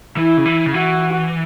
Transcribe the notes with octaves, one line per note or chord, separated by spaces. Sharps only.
E3 E4
C#3
E3
C#3
E3 F#4